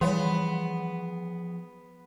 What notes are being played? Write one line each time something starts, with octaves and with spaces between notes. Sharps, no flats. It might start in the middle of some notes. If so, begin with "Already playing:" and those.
E3 F3 G3 B3 G#4 C#5 F5 C6